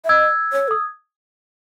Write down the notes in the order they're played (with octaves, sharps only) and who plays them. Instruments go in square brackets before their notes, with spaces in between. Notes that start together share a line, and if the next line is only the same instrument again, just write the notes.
[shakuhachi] E5
[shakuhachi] D#5 [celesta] E6 G#6
[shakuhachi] C#5
A4
[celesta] D#6